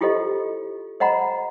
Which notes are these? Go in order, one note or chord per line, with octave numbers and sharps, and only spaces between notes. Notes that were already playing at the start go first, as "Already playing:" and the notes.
E4 F4 G4 A4 C5 D#5
C5 D#5 F#5 A#5 B5